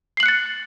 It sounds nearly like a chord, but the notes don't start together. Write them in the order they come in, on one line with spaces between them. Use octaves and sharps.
C7 F#7 F#6 C#7 A6